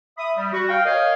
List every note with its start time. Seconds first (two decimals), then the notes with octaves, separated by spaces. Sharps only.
0.18 E5 B5 D#6
0.37 G3
0.53 F#4
0.69 F5 G5
0.85 A#4 C#5 D#5 F5